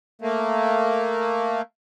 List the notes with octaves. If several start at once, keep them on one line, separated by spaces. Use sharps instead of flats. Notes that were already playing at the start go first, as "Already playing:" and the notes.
A3 A#3